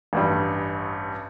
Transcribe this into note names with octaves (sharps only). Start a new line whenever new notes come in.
A1 G2 G3